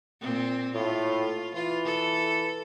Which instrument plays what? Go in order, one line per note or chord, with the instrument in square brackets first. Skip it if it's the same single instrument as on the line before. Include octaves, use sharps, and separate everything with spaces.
[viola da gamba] A#2 C4
[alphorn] A2 [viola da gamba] F4
[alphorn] E3 [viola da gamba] F4
[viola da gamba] A4